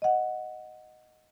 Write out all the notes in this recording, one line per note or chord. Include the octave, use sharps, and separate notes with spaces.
D#5 F#5